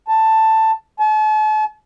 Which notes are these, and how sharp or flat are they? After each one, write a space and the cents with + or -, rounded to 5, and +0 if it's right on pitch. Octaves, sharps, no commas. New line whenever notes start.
A5 +10
A5 -40